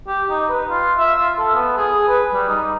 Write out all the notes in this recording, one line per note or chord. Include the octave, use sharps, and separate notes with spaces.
G4
D#4
B4
F4
E5
F4
A4
B3
G#4
B4
G3
D#4